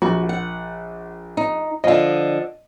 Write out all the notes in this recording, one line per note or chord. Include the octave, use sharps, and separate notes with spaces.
A#1 F#4
F#5
D#4
D3 F3 D#5 F5